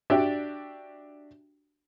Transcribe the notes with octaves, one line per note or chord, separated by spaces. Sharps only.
D4 F#4 G4 D5 E5